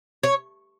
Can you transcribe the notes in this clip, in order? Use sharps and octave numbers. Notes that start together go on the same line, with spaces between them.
C#5